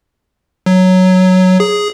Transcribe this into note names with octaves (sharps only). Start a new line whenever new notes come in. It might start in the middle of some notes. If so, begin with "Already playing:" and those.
F#3
G#4